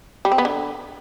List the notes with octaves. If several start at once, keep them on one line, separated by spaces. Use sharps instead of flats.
G3
C4
B3
D3